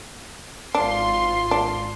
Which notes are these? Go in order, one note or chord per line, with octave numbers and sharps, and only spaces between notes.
G#1 D4 F4 C6
D4